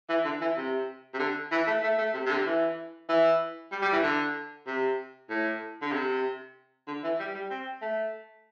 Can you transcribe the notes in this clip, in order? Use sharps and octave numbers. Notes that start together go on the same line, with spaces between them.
E3
D3
E3
C3
C3
D3
E3
A3
A3
A3
C3
C3
D3
E3
E3
G3
G3
E3
D3
C3
A2
D3
C3
D3
E3
G3
G3
C4
A3